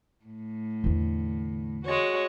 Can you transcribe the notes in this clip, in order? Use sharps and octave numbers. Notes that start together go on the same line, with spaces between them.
A2
E2 D3
G#3 F#4 C#5